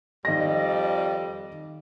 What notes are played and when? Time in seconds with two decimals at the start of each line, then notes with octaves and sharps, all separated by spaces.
0.25 F2 D#3 G3 D#5 A#6